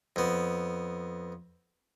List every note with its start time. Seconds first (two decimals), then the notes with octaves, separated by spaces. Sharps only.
0.16 F2 B3